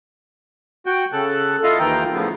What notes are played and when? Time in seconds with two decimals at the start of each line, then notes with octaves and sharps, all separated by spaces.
0.86 F#4 G5
1.13 C#3 A4 F#6
1.64 E4 F4 A4 D#5 F5
1.79 D#2 D#3 E3 F4 G5 A#5
2.12 A2 C#3 F3 B3